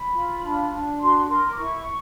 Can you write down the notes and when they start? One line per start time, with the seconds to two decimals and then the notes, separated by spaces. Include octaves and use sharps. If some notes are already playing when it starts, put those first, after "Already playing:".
Already playing: B5
0.12 F4
0.41 D4
0.71 D4
0.99 F#4 C6
1.28 A#4 C6
1.51 D6
1.57 E4 C#6